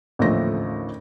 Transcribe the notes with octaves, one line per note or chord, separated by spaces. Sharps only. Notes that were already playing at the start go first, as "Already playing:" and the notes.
A1 D#2 D3 F3 A3 A#6